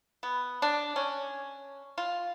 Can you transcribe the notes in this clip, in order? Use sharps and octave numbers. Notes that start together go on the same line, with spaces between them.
B3
D4
C#4
F4